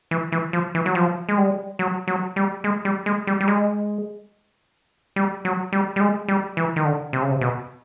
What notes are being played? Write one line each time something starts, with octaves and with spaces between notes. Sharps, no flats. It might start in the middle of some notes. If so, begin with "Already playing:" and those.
E3
E3
F3
E3
F#3
F3
G#3
G3
F#3
F#3
G3
G#3
G3
G#3
G3
G3
G#3
G3
F#3
G3
G3
G#3
G3
E3
D#3
D3
C3
C#3
C3
B2